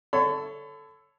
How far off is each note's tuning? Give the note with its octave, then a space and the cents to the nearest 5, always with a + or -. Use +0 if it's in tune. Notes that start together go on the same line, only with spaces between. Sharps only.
A4 +0 C#5 +0 B5 +40